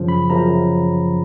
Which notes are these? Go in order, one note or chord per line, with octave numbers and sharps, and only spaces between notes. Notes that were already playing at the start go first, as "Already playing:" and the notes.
Already playing: F#2 C#3 F3
B5
F#2 C#3 F3 A#5